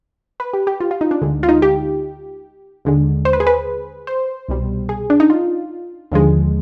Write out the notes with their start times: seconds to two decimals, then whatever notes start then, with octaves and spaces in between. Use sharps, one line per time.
0.40 B4
0.53 G4
0.67 G4
0.80 F4
0.91 F4
1.01 D#4
1.11 D4
1.22 D2 D3 G#3
1.43 F4
1.49 D#4
1.62 G4
2.85 D#2 D3 G#3
3.25 C5
3.33 B4
3.40 G#4
3.47 B4
4.07 C5
4.49 C2 B2 G3
4.89 G#4
5.10 D4
5.20 D#4
5.30 F4
6.12 D#2 D3 F3 G#3